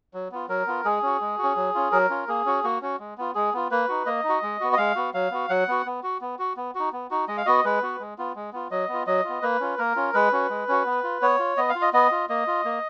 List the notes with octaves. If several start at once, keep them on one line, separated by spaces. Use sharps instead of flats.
F#3
B3 F4
F#3 A#4
B3 F4
G#3 G#4
C#4 F#4
G#3
C#4 F#4
F#3
C#4 F4
F#3 A#4
C#4 F4
A#3 G#4
C#4 F#4
A#3 F#4
C#4 F#4
G#3
B3 F4
G#3 G#4
B3 F4
A#3 B4
D#4 F#4
A#3 D#5
D#4
F#4
G#3
B3 F#4
D#5
G#3 F5
B3 F#4
F#3 F5
B3 F#4
F#3 F#5
B3 F#4
B3
F#4
B3
F#4
B3
D#4 F#4
B3
D#4 F#4
G#3 D#5
F5
B3 F#4 D#5
G#3 B4
B3 F#4
G#3
B3 F4
G#3
B3 F4
F#3 D#5
B3 F4
F#3 D#5
B3 F4
A#3 B4
C#4 F4
A#3 A#4
C#4 F4
G#3 B4
C#4 F#4
G#3
C#4 F#4
B3
F4
B3 C#5
F4
B3 D#5
F5
F4
D#5
B3 D#5
F4
A#3 D#5
F4
A#3